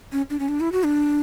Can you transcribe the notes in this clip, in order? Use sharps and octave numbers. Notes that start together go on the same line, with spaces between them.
C#4
D4
C#4
D4
E4
F#4
D4